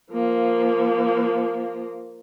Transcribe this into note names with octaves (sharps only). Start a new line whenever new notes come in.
F3 A#3